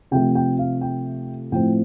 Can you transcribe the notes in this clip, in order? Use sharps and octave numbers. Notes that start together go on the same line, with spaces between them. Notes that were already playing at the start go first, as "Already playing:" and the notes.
C3 F3 A3 G5
G5
F5
G5
A2 F3 A3 C4 G5